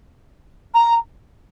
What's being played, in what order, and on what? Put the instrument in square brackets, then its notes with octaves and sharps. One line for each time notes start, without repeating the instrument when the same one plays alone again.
[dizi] A#5